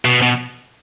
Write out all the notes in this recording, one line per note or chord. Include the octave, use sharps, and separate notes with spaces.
B2
B2